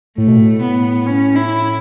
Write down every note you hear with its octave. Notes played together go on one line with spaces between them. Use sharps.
A2 A3
B2
A2
B3
C#4
E4